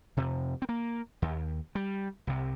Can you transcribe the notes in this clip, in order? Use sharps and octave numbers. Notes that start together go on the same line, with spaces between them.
F2 C3
C4
A#3
D#2
G3
C2 C3